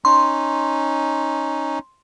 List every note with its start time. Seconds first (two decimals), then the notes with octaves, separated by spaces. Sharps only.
0.05 C#4 D#4 C6